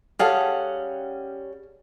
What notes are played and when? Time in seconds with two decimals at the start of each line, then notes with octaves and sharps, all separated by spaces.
0.19 G3 C#4 G#4 A4 F5 F#5